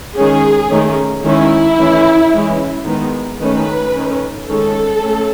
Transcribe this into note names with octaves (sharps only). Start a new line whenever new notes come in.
D#3 G#3 C#4 G#4
D#3 A3 C#4
D#3 G#3 C#4 E4
E3 A3 C#4
E3 G#3 C#4
D#3 G#3 B3
D#3 A3 C#4 B4
D#3 A3 C#4
D#3 G#3 C#4 A4
A3 C#4